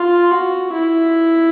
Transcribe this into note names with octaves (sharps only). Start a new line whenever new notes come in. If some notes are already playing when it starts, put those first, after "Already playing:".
Already playing: F4
F#4
E4